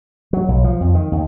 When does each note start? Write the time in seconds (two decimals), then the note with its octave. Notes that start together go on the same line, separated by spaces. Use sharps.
0.33 F#3
0.48 B1
0.64 F3
0.81 F2
0.95 D#3
1.12 D#2